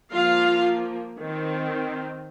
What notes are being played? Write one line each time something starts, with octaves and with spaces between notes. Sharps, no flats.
F3 A#3 F4 F5
D#3 C4